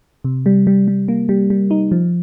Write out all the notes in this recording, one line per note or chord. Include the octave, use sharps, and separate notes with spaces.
C3
G3
G3
G3
A#3
G3
G3
D#4
F3